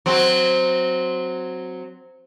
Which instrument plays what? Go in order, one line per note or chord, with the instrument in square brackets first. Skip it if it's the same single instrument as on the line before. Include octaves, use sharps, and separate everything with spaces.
[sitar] F#3 C4